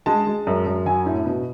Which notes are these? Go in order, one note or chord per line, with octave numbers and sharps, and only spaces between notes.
G#3 A5
G#3
F#2
F#2
F#3 G#5
A2
B2